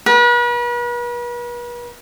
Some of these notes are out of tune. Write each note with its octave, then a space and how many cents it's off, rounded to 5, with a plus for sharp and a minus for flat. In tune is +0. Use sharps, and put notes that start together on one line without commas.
B4 -40